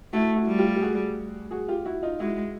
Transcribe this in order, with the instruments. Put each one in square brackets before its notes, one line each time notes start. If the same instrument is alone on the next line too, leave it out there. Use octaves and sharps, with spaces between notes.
[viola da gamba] A3 [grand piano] E4 F#4
[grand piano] E4 F#4
[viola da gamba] G3
[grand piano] F4 G4
G4
F#4 G#4
F#4 G#4
F4 G4
E4 F#4
D#4 F4
[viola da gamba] G#3 [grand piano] E4 F#4